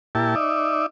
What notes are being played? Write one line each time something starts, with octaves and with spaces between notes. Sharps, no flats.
A#2 E4 G4 A5
D#4 D5 E5